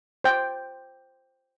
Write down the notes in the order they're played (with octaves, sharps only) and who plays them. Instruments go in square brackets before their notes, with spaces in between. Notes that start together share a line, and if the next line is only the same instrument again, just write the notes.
[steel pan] C5 G5